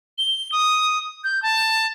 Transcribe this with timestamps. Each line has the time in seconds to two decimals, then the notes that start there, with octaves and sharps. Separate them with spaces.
0.18 G7
0.52 D#6
1.24 G6
1.43 A5